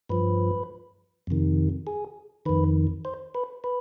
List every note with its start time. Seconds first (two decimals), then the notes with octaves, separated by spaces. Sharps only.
0.09 G2 F3 B4
1.27 F2 C3 D#3
1.87 G#4
2.46 F2 D#3 B4
3.05 C5
3.35 B4
3.64 B4